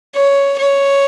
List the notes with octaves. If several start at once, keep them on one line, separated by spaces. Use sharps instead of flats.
C#5
C#5